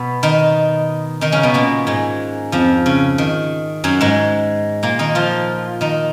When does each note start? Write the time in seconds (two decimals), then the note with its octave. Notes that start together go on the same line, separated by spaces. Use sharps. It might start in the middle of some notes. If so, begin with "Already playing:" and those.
Already playing: B2 B3
0.23 D#3 D#4
1.21 D#3 D#4
1.32 C#3 C#4
1.43 B2 B3
1.54 A#2 A#3
1.87 G#2 G#3
2.52 F2 F3
2.86 C#3
3.18 D#3
3.84 F#2 F#3
4.01 G#2 G#3
4.83 A#2 A#3
4.99 D#3 D#4
5.15 F3 F4
5.81 D#3 D#4